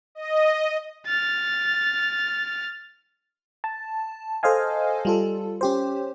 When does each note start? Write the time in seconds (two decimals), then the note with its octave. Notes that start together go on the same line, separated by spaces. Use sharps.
0.15 D#5
1.06 F6 A6
3.64 A5
4.43 A4 C5 D#5 F5 G#5
5.05 G3 F4 A4
5.61 C#4 G4 C5